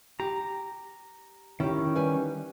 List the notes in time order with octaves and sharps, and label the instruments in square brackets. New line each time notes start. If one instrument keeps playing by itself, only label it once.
[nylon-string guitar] G4 [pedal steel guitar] A#5
[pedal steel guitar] D#3 C#4 [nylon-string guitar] E4 G4
[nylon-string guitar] G3 B4 G#5